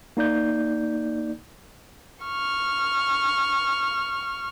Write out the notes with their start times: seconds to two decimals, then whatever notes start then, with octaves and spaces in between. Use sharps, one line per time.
0.17 A#3 D#4 D5 G6
2.25 C#6 F6